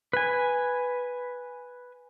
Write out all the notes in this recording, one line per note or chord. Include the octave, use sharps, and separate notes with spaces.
B4 G#5